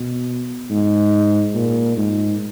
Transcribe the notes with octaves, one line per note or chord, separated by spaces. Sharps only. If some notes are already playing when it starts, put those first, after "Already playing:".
Already playing: B2
G#2
A#2
G#2